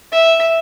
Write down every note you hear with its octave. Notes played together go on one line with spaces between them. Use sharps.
E5